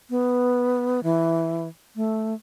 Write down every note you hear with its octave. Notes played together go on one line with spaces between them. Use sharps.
B3
E3
A3